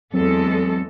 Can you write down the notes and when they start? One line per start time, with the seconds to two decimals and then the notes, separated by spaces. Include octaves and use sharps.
0.14 E2 F#3 G#3 C4 A4